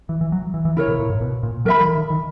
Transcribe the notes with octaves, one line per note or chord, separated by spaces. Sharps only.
E3
E3
F#3
E3
E3
C#3 E4 A#4 C#5
B2
A#2
G#2
B2
A#2
F#3 A#4 E5 B5
E3
D#3
D#3